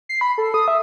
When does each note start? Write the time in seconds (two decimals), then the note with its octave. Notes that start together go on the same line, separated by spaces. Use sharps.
0.09 C7
0.21 B5
0.38 A4
0.54 D#6
0.68 E5